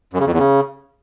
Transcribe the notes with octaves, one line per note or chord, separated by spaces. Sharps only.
F#2
C#3
F2
E2
C#3